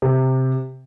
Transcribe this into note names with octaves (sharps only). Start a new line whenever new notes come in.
C3